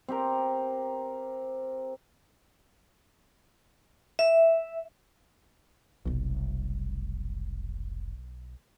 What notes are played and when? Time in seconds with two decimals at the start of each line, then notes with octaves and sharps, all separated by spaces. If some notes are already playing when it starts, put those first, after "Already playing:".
0.08 C4 G4 A#4
4.19 E5
6.06 F1 B1 G3